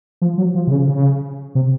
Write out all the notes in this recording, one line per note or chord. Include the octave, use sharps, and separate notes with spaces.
F3
F#3
F3
C3
C#3
C#3
C3